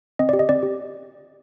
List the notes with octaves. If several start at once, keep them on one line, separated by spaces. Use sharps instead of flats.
C4 D#5
D5
G4
D#5
C4 D5
G4